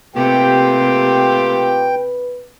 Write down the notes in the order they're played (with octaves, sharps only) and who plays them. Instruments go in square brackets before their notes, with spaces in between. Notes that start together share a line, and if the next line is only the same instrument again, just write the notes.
[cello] C3 A#3 [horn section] A3 F4 G4 [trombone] B4 [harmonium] G5